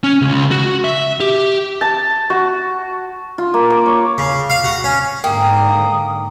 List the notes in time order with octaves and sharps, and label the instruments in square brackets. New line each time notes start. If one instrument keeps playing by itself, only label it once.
[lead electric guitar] C#4
C#2
F#4
E5
G4
[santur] A5
F#4
[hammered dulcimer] F4
A#3
D6
C#5
[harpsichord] C#3
F5
F#4
C#4
[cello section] G#2 D3 [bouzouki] A#3 [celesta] G5 [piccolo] D#6